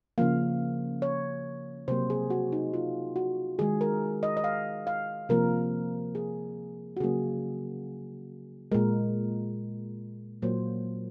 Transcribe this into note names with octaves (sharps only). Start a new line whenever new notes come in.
C#3 F3 A#3 F5
C#5
C3 F#3 A#3 C5
G#4
F#4
D#4
F4
F#4
D#3 G#3 G#4
A#4
D#5
D#5
F5
F5
C3 F3 A#3 A#4
G#4
F#4
C#3 F#3 A#3 G#4
A#2 G#3 A#4
A#2 F#3 A#3 C5